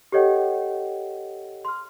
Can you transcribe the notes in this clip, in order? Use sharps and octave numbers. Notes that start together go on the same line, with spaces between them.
G4 A4 C#5 D#5 F#5 G5
C6 F6